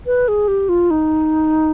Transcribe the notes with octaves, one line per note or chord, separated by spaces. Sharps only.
B4
G#4
G4
F4
D#4